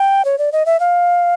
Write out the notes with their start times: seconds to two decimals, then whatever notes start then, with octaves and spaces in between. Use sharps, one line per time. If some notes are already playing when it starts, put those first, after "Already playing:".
Already playing: G5
0.25 C#5
0.38 D5
0.52 D#5
0.66 E5
0.80 F5